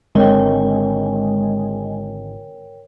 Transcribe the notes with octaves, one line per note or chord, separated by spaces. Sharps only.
G#1 D3 G#3 C4 A#4 C#5 G5